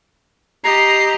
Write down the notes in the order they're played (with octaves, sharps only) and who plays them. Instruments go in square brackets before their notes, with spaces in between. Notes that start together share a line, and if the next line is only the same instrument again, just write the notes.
[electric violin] G4 D#5 [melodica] A#5 [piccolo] C7